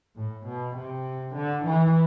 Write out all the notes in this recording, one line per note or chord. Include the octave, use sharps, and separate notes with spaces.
A2
B2
C3
D3
E3